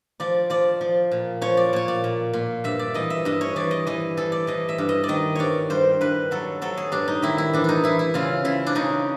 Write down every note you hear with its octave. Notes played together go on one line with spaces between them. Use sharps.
F3 D5
F3 D5
F3
A#2
F3 C#5
D5
A#2 C#5
D5
A#2
A#2
G2 E5
D5
E3 D#5
E5
G2 D#5
C#5
E3 D5
D#5
E3 D#5
E3 A4
D5
E3 D#5
E5
G2
D#5
D5
D#3 D#5
G2 C#5 D5
G2 C5
G2 B4
F#3 A4
F#3 A4
G#4
G2 D4
D#4
D#3 E4
E4
E3 D4
D4 D#4
E3 E4
E4
C#3 F4
C#3 E4
D4
C#3 D#4